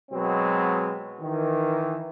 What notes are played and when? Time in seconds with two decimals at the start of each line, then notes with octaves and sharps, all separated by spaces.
0.12 B2 F#3 G#3 C4
1.21 D#3 E3